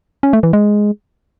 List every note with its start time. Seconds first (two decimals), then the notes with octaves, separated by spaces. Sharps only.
0.23 C#4
0.33 A3
0.43 E3
0.53 G#3